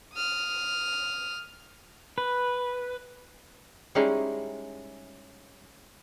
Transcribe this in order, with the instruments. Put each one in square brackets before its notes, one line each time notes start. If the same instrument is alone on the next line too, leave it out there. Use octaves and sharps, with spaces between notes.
[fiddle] D#6 F6
[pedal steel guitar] B4
[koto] G3 G#3 C#4 D#4 E4 G#4